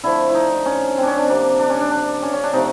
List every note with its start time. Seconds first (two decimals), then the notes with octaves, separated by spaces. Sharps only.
0.04 D3 F3 A3 E4
0.29 E4
0.35 D#4
0.66 C#4
0.98 C4
1.03 C#4 D4
1.18 D4
1.29 C3 F3 A#3
1.59 D4
1.70 C#4
1.80 D4
1.91 D4
2.22 C#4
2.33 C#4
2.44 D4
2.53 C3 F3 A3 D#4